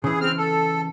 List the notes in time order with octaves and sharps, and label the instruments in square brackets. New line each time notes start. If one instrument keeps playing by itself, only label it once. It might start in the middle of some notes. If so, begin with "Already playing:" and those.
[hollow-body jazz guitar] C#3 E3 [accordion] G#4
[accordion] C4 F6
A4